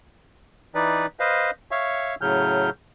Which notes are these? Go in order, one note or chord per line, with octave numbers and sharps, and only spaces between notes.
E3 D#4 B4 D5
B4 C5 D#5 F5
C#5 E5 F5 C#6
A2 C#3 F#3 F6 G6